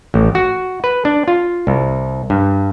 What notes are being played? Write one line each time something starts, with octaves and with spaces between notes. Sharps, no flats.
A1
F#4
B4
D4
F4
C2
G2